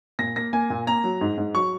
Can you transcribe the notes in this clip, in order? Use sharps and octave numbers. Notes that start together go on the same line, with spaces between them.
A#2 A#6
A#3 A#6
A#3 G#5
A#2
A#3 A#5
F#3
G#2
G#2
F#3 C#6